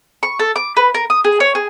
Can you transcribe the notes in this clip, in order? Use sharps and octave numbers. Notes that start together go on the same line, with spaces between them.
C#6
A4
D6
B4
A#4
D#6
G#4
C#5
G#4